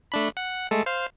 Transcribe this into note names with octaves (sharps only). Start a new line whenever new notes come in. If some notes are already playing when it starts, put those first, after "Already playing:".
A3 D4 B5
F#5
G#3 A3 A4
C5 F5